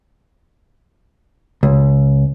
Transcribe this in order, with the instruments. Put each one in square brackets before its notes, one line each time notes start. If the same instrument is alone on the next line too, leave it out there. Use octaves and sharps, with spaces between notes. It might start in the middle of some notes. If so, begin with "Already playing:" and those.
[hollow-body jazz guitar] C#2